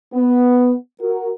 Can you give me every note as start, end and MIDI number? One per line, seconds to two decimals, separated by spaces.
0.14 0.73 59
1.00 1.30 66
1.00 1.30 70